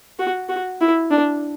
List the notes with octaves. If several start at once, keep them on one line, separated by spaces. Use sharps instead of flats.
F#4
F#4
E4
D4